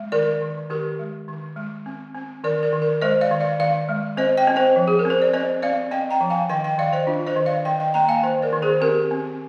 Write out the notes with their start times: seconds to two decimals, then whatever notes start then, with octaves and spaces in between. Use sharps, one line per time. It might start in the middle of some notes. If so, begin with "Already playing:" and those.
Already playing: G#3
0.12 D#3 A#4 D5
0.42 D#3
0.70 D#3 G4 A#4
0.99 G#3
1.28 D#3
1.56 G#3
1.86 C4
2.14 C4
2.44 D#3 A#4 D5
2.63 A#4 D5
2.72 D#3
2.82 A#4 D5
3.02 G#3 C5 D#5
3.21 D5 F5
3.31 D#3
3.40 D5 F5
3.60 D#3 D5 F5
3.89 G#3
4.17 C4 C5 D#5
4.37 D#5 G5
4.47 C4
4.56 C5 D#5
4.76 F3
4.88 G#4
4.99 A#4
5.05 C4
5.10 C5
5.22 D5
5.33 C4 C5 D#5
5.62 C4 D5 F5
5.91 C4 D#5 G5
6.11 G5 A#5
6.21 F3
6.30 F5 G#5
6.49 D#3 D#5 G5
6.64 D#5 G5
6.78 D#3 D5 F5
6.93 C5 D#5
7.07 D4 F4
7.27 C5 D#5
7.36 D#3
7.46 D5 F5
7.65 D#3 D#5 G5
7.80 D#5 G5
7.94 A#3 G5 A#5
8.09 F5 G#5
8.23 D#3 C5 D#5
8.42 A#4 D5
8.53 D#3
8.62 G#4 C5
8.81 C4 G4 A#4
9.11 C4